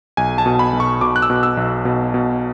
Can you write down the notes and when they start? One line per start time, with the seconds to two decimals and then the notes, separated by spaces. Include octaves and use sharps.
0.17 B1 G#5
0.38 A5
0.46 B2
0.59 B5
0.73 B1
0.80 C#6
1.01 B2 D6
1.16 F#6
1.22 E6
1.30 B2
1.43 E6
1.57 B1
1.85 B2
2.14 B2